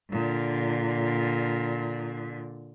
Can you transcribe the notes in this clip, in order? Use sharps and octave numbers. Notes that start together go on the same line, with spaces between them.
A#2 D3